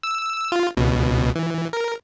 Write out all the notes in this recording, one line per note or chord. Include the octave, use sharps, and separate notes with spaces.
E6
F4
C#2 B2
E3
A#4